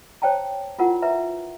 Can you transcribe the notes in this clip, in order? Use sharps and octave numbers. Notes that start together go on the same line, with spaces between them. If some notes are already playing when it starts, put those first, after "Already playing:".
C5 C#5 G5 A5 A#5
E4 F4 A#4 F#5
B4 E5 A#5